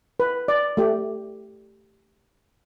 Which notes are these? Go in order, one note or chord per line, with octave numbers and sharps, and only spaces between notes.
B4
D5
A3 G4